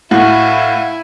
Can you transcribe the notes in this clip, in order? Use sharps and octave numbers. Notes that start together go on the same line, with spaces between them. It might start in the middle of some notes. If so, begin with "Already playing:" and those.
A2 E4 F#4 F5 G#5 C#6